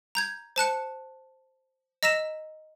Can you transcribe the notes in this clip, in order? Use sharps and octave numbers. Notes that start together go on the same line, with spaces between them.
A#5 G6 G#6
C5 A5 F#6 C#7
D#5 A#5 E6 B6 E7